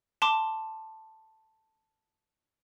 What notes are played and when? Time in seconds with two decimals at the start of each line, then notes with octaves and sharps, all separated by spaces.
0.22 A5 C6 D6